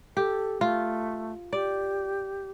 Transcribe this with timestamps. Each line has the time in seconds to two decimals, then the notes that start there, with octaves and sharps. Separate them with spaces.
0.17 G4 A4
0.61 A3 F4
1.53 G4 D5